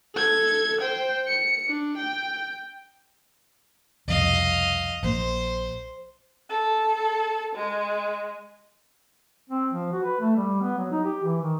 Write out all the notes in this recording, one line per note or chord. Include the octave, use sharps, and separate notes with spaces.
A4 G#6
C5 G5
C#7
D4
G5
C2 F2 B2 D#5 F5
A#1 A#3 C5
A4
G#3
C4
F3
F#4
B4
A3
G3
B3
F#3
D#4
G4
E3
D#3